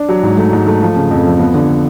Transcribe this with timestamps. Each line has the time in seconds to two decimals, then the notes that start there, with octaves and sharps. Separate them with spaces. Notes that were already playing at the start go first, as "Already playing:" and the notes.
Already playing: D4
0.09 F#3
0.23 G#2
0.37 A3
0.53 G#2
0.67 A3
0.81 F3
0.96 C#3
1.11 F2
1.26 F3
1.40 B3
1.54 D3